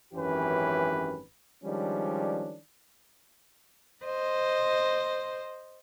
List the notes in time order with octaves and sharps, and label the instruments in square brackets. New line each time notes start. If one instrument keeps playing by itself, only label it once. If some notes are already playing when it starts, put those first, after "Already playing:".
[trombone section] G#1 F#2 E3 C#4 G4 B4
D#3 F3 G3 G#3 C#4 D4
[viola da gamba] C5 D#5